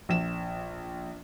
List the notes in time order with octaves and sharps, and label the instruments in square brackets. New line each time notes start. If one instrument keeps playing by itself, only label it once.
[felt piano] A#1 E7